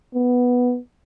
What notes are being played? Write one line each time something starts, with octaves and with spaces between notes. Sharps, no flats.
B3